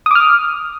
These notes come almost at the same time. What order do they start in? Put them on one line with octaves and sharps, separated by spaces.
D#6 D6 F6